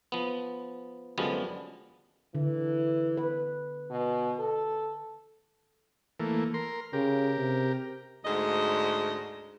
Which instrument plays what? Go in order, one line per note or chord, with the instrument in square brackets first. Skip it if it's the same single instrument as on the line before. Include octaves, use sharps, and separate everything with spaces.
[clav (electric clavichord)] F3 B3
F#2 D3 F3 G3 G#3 B3
[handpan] D3 [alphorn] E3
[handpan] B4
[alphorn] B2
A4
[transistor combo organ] E3 A3 A#3
A#4 C6
[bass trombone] C#3 [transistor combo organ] G4 A#4
[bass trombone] C3
[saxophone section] D2 G#2 D#5